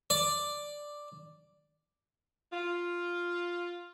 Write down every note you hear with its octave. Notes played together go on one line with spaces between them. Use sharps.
D5
F4